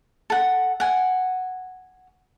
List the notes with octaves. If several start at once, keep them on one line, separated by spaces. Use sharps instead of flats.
A4 F#5
F#5 G#5